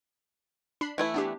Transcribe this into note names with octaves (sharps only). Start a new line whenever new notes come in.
D4 B5 C7
E3 A3 E4
B3 D4 G4